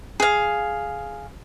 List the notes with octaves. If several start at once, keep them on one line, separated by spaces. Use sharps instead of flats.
G#4 F5